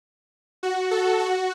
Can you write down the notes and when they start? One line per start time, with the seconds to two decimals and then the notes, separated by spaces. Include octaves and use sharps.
0.63 F#4
0.91 A4
1.19 F#4